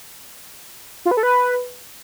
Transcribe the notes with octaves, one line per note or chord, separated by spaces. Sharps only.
F4
B4
A4
B4